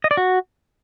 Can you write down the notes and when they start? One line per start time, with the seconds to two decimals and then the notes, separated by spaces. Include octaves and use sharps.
0.04 D#5
0.11 D5
0.17 F#4